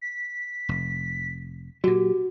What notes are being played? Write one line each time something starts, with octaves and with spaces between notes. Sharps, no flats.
B6
F1
A#2 F#3 F#4 G4